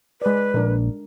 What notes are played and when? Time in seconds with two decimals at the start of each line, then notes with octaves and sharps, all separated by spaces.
0.22 G#3 B4 D5
0.54 A#1 D4 A#4